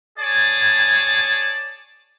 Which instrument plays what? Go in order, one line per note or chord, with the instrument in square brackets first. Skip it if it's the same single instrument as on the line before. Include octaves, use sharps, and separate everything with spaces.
[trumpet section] G#4 C#5 D5 G#5 A5